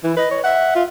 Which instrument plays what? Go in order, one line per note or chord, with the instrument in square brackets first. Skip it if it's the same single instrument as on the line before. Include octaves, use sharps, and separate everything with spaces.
[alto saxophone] E3 [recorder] E4
[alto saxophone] B4 [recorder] D#5
[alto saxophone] C#5
[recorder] E5 [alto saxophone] F#5
[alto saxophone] F4